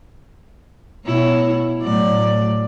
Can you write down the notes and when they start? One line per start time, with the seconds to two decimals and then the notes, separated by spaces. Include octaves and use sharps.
1.06 B2 E4 C#5
1.82 A2 F#3 D5